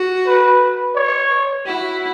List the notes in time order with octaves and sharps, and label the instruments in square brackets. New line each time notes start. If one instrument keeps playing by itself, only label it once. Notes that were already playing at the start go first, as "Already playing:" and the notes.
Already playing: [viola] F#4
[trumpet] B4
C#5
[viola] E4 [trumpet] F#4